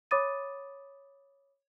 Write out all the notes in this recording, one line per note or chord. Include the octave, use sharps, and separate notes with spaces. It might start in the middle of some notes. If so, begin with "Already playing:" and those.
C#5 B5 D6 D#6 A6 D#7